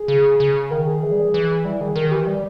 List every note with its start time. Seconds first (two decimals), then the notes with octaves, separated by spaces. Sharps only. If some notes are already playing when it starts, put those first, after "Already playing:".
Already playing: G#4
0.08 C#3
0.40 C#3
0.71 D#3 A#4
0.87 G#4
1.02 E3
1.12 G3
1.21 E3
1.34 E3
1.65 G3 E4
1.81 D#3 G#4
1.95 D#3 A#4
2.11 E3 G4
2.27 G3